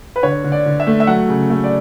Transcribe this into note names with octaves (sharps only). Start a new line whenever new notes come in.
B4
D3 C#5
D3
D5
D3
E5
A3
E5
F#3 F#5
C#3
A3
D5